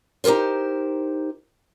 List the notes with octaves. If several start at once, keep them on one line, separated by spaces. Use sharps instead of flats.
D#4 G4 A4 A#4 C5